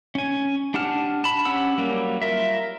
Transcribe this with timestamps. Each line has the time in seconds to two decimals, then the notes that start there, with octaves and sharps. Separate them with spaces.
0.15 C#4 G#5
0.74 D4 G4 F#5 A5 F6
1.24 A5 B5
1.45 C#4 G4 F#5 E6
1.78 F#3 G3 A#3
2.22 F4 A#4 E5